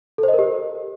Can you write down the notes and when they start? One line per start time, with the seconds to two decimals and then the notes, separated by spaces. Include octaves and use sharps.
0.18 A4
0.23 C5
0.28 D#5
0.34 A#4
0.39 G4